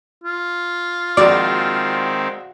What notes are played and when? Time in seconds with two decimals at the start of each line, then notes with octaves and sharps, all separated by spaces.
0.24 F4
1.17 A#1 D#3 G#3 C4 F#4 D5 F5